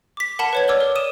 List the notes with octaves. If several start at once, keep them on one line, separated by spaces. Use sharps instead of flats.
D6 B6
A#4 F#5 A5 B5 C#7 E7
B4 C#5 G#6
C#5 D5 D6 E6 F6 G7
A#4
A#4 D#6 D#7 E7